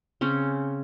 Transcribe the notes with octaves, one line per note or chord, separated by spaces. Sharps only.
C#3 C4 C#4